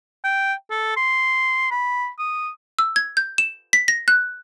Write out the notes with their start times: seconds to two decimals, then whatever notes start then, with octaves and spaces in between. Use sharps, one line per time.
0.24 G5
0.71 A4
0.96 C6
1.71 B5
2.18 D#6
2.79 E6
2.96 G#6
3.17 G6
3.38 E7
3.73 B6
3.88 A#6
4.08 F#6